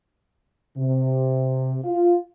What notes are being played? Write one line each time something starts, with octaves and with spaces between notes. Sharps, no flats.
C3
F4